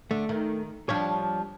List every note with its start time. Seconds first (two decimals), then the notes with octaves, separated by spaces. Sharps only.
0.11 D3 A3
0.29 D#3
0.89 F3 G3 D4 C#5